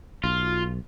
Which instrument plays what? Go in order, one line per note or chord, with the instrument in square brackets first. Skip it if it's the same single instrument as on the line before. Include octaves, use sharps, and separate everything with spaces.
[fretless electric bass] B1 [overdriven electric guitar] F4